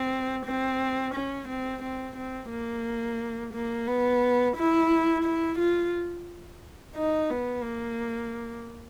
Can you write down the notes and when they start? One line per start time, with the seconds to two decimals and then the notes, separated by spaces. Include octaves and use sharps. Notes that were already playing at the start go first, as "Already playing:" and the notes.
Already playing: C4
0.46 C4
1.14 C#4
1.48 C4
1.83 C4
2.16 C4
2.51 A#3
3.53 A#3
3.87 B3
4.56 E4
5.24 E4
5.59 F4
6.96 D#4
7.30 B3
7.64 A#3